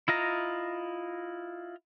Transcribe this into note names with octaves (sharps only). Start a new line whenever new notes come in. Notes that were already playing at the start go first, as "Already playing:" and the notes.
E4 F4 D#5 A#5